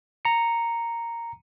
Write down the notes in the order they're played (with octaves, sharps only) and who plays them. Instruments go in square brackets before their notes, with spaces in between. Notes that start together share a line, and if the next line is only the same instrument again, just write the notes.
[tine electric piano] A#5 C#7